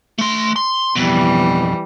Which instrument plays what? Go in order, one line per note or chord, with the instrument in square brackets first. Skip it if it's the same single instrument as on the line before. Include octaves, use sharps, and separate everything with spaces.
[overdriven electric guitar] A3 C6
C6
[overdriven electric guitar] F2 B2 [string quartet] E3 G3